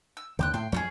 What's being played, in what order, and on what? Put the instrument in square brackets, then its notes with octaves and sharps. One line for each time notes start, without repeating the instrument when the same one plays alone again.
[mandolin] E6
[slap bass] D#2 D3 [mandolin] G5 D6 F#6
[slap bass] A2 [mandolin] G5 C6
[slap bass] F2 F3 F#3 [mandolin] C#4 F4 G#4